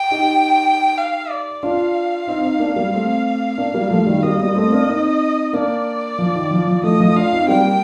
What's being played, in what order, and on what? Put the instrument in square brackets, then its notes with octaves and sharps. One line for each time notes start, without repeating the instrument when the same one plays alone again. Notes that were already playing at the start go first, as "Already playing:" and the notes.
Already playing: [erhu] G5
[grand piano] D#4 G4
[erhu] F5
D5
[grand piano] D4 F4 [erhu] F5
[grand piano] C4 D#4
C4 D#4
A#3 D4
G3 A#3
A3 C4
A#3 D4
G3 A#3
F3 A3
D#3 G3
[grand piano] G3 A#3 [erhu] D#5
[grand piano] G3 A#3
A3 C4
A#3 D4
C4 D#4
[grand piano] A#3 D4 [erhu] D5
[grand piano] F3
D#3
F3
F3
[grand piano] F3 A3 [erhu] D#5
[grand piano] F3 A3
[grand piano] D4 F4 [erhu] F5
[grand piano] C4 D#4
[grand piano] G3 A#3 [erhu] G5